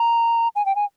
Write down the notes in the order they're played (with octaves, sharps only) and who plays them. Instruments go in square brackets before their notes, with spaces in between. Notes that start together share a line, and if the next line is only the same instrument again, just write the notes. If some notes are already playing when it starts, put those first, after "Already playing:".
Already playing: [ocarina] A#5
G#5
G5
G#5